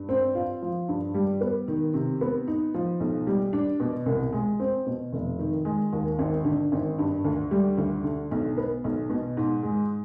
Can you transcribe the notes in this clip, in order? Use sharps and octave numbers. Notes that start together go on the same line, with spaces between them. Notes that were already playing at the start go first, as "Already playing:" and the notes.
Already playing: G2
C4
F4
F3
G2
G3
B3
D#3
C3
B3
D#4
F3
B1
G3
D4
B2
C2
G#3
C4
B2
F1
D#3
G#3
D#2
G#1
D3
G#1
G2
D2
G3
D2
D3
B1
B3
B1
B2
G#2
G#3